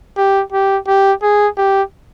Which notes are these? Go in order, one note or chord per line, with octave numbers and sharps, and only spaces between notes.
G4
G4
G4
G#4
G4